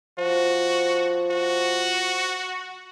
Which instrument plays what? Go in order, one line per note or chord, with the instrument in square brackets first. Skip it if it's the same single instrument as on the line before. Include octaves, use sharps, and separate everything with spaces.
[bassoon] F3 [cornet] F#4
[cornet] F#4